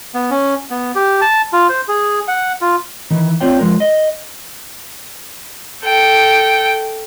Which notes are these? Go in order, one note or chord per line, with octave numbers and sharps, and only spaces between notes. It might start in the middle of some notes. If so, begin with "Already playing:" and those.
B3
C#4
B3
G4
A5
F4
C5
G#4
F#5
F4
D#3 E3
C4 F4 C#5 D5 G5
F3 G#3 A#4
D#5
A4 G5